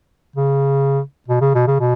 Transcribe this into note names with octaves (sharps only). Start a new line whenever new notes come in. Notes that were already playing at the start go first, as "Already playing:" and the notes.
C#3
B2
C#3
B2
C#3
B2